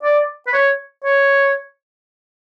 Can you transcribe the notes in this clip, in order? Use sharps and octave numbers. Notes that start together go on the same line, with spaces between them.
D5
B4
C#5
C#5